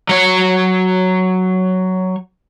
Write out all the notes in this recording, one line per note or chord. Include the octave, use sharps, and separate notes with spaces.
F#3 C#5